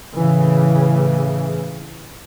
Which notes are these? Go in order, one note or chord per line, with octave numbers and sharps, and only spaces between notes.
A2 C#3 E3